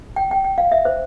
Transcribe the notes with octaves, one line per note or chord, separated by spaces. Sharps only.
G5
G5
G5
F5
E5
C5